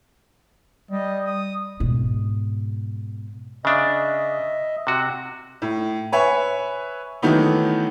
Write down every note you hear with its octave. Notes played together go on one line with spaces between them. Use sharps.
G3 D#5
D#6
G#2 B2
C#3 D4 D#5 E5
C3 F#4
A2
B4 C#5 E5 G#5
D#3 E3 F#3 A3 B3 D#4